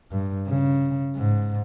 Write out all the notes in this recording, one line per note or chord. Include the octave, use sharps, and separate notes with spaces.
G2
C#3
G#2